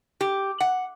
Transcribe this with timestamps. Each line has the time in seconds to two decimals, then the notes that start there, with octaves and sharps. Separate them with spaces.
0.21 G4
0.60 F#5